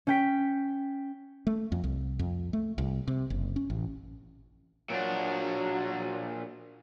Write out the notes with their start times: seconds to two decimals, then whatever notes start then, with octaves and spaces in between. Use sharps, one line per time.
0.07 C#4 G5 B6
1.47 A3
1.72 F2
1.84 C2
2.19 F2
2.53 A3
2.78 C2
3.08 C3
3.30 F#1
3.56 C#4
3.70 A1
4.90 A#2 F#3 D4